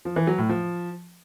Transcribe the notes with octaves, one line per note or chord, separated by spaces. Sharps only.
F3
E3
F#3
A2
F3